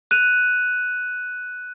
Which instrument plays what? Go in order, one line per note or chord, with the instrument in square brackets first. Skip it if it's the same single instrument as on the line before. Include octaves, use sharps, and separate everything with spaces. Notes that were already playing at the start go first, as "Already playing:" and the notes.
[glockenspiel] F#6 D#7 F7